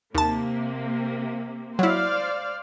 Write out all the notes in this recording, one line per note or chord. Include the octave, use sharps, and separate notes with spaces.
D#2 C3 A#3 A5
F#3 E4 C5 D5 F5